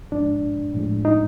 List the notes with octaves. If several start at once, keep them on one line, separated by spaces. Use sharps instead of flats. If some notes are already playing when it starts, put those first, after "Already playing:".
G#2 F3 G#3 D4
A2 F3 G#3
D#4